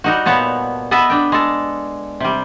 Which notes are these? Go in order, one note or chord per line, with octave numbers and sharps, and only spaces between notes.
G3 D#4 F#4
A#2 B3 C#5 A5
B3 A4 B4 D#5 E5
D4 G5
G#3 A4
C3 G3